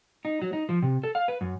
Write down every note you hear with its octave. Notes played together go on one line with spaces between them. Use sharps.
D#4
F#3
D#4
F3
C3
A4
F5
B4
F#2